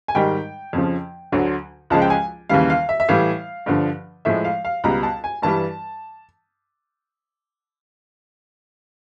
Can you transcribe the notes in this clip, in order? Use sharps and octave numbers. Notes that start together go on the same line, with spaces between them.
G#5
G#2 D#3 G3 G5
F2 C#3 F3
D2 D3 F#3
C#2 C#3 F3 G#3 A5
G5
G#5
D#2 C#3 E3 G3 F5
F5
E5
E5
A2 E3 G3 F5
G2 D3 F3
A2 F3 G#3 E5
F5
F5
C#2 B2 G3 A#5
A5
G#5
G2 E3 G3 A5